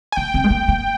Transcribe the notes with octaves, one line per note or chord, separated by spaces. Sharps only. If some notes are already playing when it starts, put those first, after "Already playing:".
G#5
A#3 G5
C4
G#3
A#3
A#3